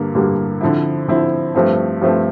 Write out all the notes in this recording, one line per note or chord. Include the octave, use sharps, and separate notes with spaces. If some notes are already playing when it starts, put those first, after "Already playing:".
Already playing: G2 D3 A#3
G2 D3 G3 A#3
D3 F3 C4 E4
D3 F3 C4 E4
G2 F3 A3 C4
G2 F3 A3 C4